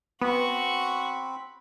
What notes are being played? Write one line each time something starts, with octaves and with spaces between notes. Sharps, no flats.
B3 C4 F#4 B5 C#6